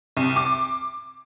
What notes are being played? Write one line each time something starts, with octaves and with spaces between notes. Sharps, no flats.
C2
D6